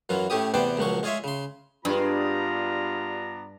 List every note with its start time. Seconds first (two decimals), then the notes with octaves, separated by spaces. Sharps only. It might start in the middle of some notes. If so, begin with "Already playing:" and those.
0.09 F#2 E3 F#3 F4
0.30 A2 A3 C#4 G4 D#6
0.54 E2 C3 B3 C5 D5 G5
0.77 C#2 A#2 F3 F#3 C#6
1.03 G#3 F4 G#4 C#5 E5
1.24 C#3 C6
1.85 G2 G3 G#3 B3 D4 F4 A#5